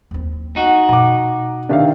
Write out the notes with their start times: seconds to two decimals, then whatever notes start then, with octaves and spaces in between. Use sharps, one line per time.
0.11 D#2 C4
0.56 D#4 F#4
0.89 B2 A#5 D6
1.69 C3 D#3 D4 E5 F5